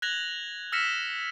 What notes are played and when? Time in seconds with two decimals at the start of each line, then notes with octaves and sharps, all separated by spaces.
0.02 F#6 G#6 A#6 F7 F#7
0.72 E6 F6 A#6 B6 C#7 E7